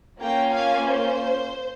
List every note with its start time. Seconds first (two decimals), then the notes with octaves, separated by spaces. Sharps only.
0.20 A#3 C#4 F4 G5 A#5
0.53 F5 G#5
0.86 C5